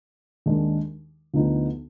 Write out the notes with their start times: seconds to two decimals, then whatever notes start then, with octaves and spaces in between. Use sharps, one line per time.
0.46 D#2 D#3 G#3 D4
1.34 D2 D3 F3 B3 D#4